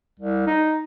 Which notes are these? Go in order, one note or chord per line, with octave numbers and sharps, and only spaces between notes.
C2
D#4